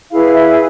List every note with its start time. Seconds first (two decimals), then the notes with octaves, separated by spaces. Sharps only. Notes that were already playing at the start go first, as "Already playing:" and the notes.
0.10 E4 G#4 B4 F5
0.33 E5